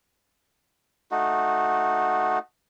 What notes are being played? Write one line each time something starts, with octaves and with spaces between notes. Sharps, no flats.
A3 D#4 F#4